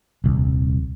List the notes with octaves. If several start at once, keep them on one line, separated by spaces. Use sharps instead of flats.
D#1 C2